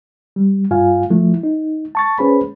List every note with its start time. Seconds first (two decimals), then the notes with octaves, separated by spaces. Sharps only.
0.36 G3
0.71 G2 F4 F5 G#5
1.10 F3 A3 E4
1.43 D#4
1.95 A5 C#6 A6
2.19 C#4 G#4 B4 C5 B5